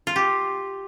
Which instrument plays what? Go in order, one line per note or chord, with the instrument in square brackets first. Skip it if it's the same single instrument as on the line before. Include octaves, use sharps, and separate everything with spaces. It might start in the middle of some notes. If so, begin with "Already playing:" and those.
[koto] F4
G4